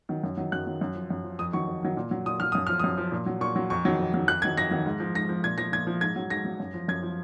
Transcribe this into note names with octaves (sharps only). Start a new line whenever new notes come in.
D#3 F#3
F#2
D#3 F#3
F#2 F#6
D#3 F#3
F#2
F3
F#2
F3
F2 D#6
D#3 F#3 C#6
F2
D#3 F#3
A#2
F#3
A#2 D#6
F#3 F6
F#2 D#6
F3 F6
F#2 D#6
F3
A#2
F#3
A#2 C#6
F#3
F2 C#6
D#3 F#3
F2
D#3 F#3
F2 F#6
D#3 F#3 G#6
F2 A#6
D#3 F#3
G#2
F3
G#2 A#6
F3
A#2 G#6
F3 A#6
A#2 G#6
F3
G#2 G#6
F#3
G#2 A#6
F#3
F#2
F3
F#2 G#6
F3